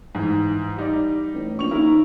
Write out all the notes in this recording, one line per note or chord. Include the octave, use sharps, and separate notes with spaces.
G#2 E3
G3 D#4 D5
A1
A#1 C#6 F7
D#2 E4 A#4